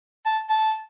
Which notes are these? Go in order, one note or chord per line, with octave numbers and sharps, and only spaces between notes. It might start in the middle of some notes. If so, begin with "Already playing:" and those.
A5
A5